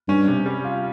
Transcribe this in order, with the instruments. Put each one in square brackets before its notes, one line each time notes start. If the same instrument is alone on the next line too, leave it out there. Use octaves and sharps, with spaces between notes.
[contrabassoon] G2 [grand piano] C#4
[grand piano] C3
G3
F4